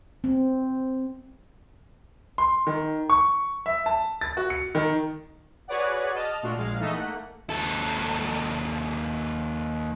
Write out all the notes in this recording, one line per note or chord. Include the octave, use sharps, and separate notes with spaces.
C4
C6
D#3
C#6
E5
A5
A6
F#4
C#7
D#3
F#4 G#4 B4 C#5 D5 F#5
D#5 A5 F6
A#2 A3 D4 F4 F#4
A#1 G#3 F5
E3 A3 D#4 A4 D#5 E5
A3 A#3 F#5
D#2 A4